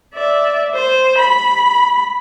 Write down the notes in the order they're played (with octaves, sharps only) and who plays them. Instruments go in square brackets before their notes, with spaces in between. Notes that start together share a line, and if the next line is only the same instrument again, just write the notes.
[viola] D5 E5
C5
B5